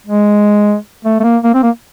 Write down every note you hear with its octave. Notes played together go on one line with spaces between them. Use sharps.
G#3
A3
A3
A#3
A#3
C4
A#3